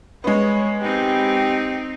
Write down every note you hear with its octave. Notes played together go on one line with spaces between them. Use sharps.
G#3 B3 C#5
C4 D#4 G4